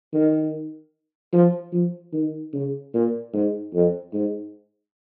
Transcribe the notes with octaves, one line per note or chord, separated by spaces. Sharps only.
D#3
F3
F3
D#3
C#3
A#2
G#2
F2
G#2